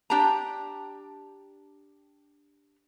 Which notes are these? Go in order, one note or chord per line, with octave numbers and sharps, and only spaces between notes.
D4 G4 G5 A5 A#5